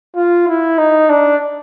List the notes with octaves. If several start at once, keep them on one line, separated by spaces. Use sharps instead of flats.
F4
E4
D#4
D4